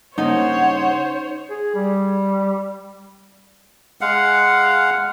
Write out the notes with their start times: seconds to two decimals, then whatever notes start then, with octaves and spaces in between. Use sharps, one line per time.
0.18 G2 C#3 A#3 D#4 C5 C#5 F#5
1.50 G#4
1.75 G3
4.01 G#3 F5 F#5